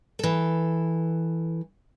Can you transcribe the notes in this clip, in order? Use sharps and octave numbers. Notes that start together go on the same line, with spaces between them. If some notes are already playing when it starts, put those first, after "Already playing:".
E3 A4